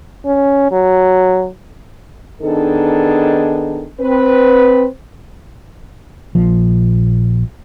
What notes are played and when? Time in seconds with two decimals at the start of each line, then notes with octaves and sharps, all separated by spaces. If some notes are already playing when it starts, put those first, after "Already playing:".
0.25 C#4
0.72 F#3
2.42 D#3 B3 D4 D#4 G#4 A4
4.00 C4 B4
6.35 A#1 A#2 F3